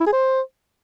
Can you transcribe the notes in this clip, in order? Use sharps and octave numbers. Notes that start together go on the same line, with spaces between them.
E4
G#4
C5